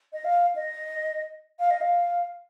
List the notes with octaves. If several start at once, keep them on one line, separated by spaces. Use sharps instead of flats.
D#5
F5
D#5
F5
D#5
F5